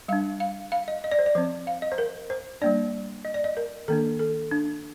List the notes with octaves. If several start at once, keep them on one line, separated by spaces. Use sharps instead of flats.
G3 D4 F5
F5
F5
D#5
D#5
D5
C5
D5
F3 C4 C5
F5
D#5
C5
A#4
C5
G3 A#3 D4 D5
D#5
D5
D#5
A#4
D#3 A#3 D4 A4
A4
D4